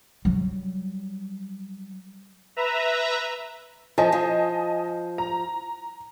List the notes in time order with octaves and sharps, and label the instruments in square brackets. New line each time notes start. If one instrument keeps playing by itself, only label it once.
[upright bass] F#3 G3
[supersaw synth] B4 E5 A#5
[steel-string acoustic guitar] F3 [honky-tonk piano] D#5 G#5 A5
[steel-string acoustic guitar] F3
[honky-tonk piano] A#5